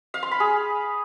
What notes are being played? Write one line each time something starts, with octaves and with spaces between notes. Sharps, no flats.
F5
C6
B5
G#4